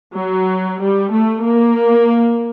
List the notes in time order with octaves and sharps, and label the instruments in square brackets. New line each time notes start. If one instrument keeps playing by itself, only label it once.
[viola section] F#3
G3
A3
A#3